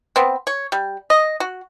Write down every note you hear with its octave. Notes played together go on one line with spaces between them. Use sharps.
B3 C4
C#5
G3
D#5
F#4